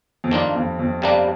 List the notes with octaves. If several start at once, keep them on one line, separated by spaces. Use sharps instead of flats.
F2
G2 D#3 A#3 D4 F4
F2
F2
G2 C3 G3 A#3 D4